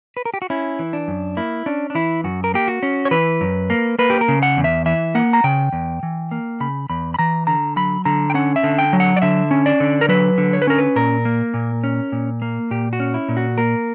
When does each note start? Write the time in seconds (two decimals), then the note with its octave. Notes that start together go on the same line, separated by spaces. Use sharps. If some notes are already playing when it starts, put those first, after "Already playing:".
0.17 B4
0.25 A#4
0.34 G4
0.42 F#4
0.50 C#4 E4
0.79 E3
0.93 D4
1.08 F#2
1.37 A#3 E4
1.66 C#4 D4
1.90 D4
1.95 E3 E4
2.24 F#2 F#4
2.44 A#4
2.54 A#3 G4
2.68 F#4
2.83 C#4
3.05 C#5
3.11 E3 B4
3.41 F#2
3.70 A#3
3.99 A#3 B4
4.10 G4
4.21 A#4
4.28 C#3
4.43 F#5
4.57 E2
4.64 E5
4.86 E3 E5
5.15 A#3 F#5
5.33 A#5
5.44 C#3 G5
5.73 E2
6.03 E3
6.31 A#3
6.60 C#3 B5
6.90 E2 B5
7.14 B5
7.19 E3 A#5
7.47 D3 A#5
7.77 F#3 B5
8.05 D3 A#5
8.30 G5
8.35 C#4 F#5
8.56 E5
8.64 D3
8.79 G5
8.93 F#3
9.00 F#5
9.16 D5
9.22 D3 E5
9.51 C#4
9.66 D5
9.80 D3
10.01 A#4
10.08 F#3 B4
10.38 D3
10.53 C#5
10.62 B4
10.67 C#4 A#4
10.78 B4
10.96 A#2 A#4
11.25 A#3
11.54 A#2
11.84 C#4
12.12 A#2
12.42 A#3
12.71 A#2 G4
12.93 F#4
13.00 C#4
13.14 E4
13.29 A#2
13.37 F#4
13.58 A#3 A#4